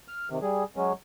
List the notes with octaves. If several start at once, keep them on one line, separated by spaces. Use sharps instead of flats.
F6
C3 D#3
G3 G#4
F#3 G#3 C#4